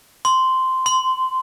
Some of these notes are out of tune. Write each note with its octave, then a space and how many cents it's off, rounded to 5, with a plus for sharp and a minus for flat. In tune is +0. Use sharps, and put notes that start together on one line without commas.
C6 -10
C6 -20